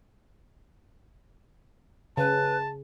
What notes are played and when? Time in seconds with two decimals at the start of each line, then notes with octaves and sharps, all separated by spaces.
2.17 C#3 B4 A5